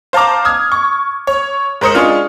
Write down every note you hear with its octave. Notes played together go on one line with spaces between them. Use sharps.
C5 F5 A5 A#5 D6
D#6 F6 G#6
C#6
C#5
G#2 A#4 C5 D#6 C#7
G#3 C#4 D4 F4